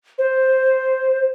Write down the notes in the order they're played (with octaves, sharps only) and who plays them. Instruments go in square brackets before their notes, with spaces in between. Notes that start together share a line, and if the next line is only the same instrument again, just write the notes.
[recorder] C5